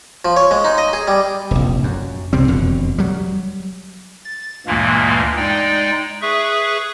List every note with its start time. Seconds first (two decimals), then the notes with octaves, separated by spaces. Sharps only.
0.25 F3
0.36 C#5
0.51 G#3
0.64 D#4
0.78 D#5
0.93 G#4
1.07 G3
1.51 F1 A#1
1.84 F#2
2.33 C2 C3 G3 C4
2.48 E1 F2 B2 D3
2.98 F#3 G3
4.25 A6
4.67 D2 G2 A#2 E3 G#3 A#3
5.37 G#3 D#4 D5 G5
6.22 G#4 B4 E5 C#6